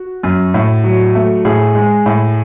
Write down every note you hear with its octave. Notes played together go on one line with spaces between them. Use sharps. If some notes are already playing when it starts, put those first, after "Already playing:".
Already playing: F#4
F#2
A2
F#3
A3
A2 G#4
G#3
A2